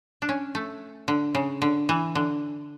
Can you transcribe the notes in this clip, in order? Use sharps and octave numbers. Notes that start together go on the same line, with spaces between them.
D4
C#4
A3
D3
C#3
D3
E3
D3